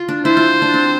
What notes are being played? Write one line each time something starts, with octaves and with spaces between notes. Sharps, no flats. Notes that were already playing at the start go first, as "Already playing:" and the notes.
Already playing: F4
D4
E4 C5
F4
D4
C4